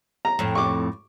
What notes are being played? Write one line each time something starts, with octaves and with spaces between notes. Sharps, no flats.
A#5
F2 A2
C#6 D6